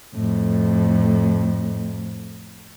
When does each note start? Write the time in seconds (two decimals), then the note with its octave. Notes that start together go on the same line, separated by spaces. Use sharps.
0.15 F2 A2